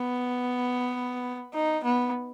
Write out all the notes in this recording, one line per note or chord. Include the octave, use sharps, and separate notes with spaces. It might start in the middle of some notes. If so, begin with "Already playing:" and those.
Already playing: B3
D#4
B3